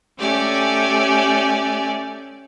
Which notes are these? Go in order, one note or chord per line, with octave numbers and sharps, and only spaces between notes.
A3 C#4 G4 D5 G#5